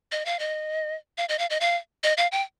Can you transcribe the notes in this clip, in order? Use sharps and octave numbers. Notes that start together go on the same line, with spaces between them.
D#5
F5
D#5
F5
D#5
F5
D#5
F5
D#5
F5
G5